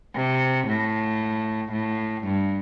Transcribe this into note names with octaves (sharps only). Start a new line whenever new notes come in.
C3
A2
A2
G2